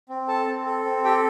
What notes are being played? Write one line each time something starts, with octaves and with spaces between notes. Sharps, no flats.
C4
A4 A5
C4
A4
C4
G4 A4 G5